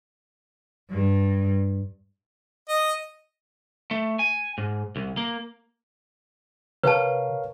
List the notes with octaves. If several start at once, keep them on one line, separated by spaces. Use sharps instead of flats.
G2
D#5
A3
G#5
G#2
C2
A#3
C3 A#4 B4 C#5 F5 A5